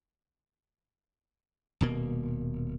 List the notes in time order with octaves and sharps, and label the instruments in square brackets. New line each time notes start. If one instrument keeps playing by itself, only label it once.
[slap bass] D#1 B2 A#3